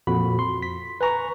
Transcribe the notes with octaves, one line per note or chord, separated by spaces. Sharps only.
F2 A#2 F#4 B5
C6
B6
B4 G#5 A#5 C#6